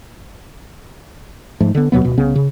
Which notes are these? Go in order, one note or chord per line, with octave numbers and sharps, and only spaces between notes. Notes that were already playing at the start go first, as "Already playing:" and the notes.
G#2 F3 A3
D3 B3
D#2 B2 F#3 B3
D1 B2
C2 C#3 B3 C#4
C#3